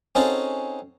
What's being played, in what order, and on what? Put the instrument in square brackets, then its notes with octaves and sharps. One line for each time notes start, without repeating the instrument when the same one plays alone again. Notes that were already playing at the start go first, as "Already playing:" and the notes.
[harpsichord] C4 C#4 D#4 F#4 G#4 A4